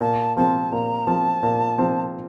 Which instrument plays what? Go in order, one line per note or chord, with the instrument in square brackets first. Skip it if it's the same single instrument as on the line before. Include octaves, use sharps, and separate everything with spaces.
[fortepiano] A#2 [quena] A5
[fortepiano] F3 C4 [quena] A5
[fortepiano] A#2 [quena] A#5
[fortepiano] F3 C4 [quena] A5
[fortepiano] A#2
F3 C4